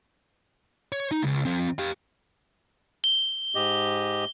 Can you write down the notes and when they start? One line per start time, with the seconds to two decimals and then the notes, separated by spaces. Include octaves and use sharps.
0.92 C#5
1.11 D#4
1.23 C#2
1.45 F3 C4
1.79 G4 F5
3.04 G7
3.55 G#2 G4 D#5